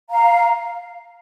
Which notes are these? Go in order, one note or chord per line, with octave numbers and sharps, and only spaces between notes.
F5 A#5